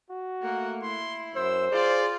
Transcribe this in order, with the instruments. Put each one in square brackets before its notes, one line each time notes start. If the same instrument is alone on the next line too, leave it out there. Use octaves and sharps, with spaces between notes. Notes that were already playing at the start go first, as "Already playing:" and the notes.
[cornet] F#4
[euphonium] A3 [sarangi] A#3 [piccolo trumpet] F#5
[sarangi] E4 [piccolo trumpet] C6
[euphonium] F#2 [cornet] C5 [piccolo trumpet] E6
[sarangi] F4 [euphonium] G#4 [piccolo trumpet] D5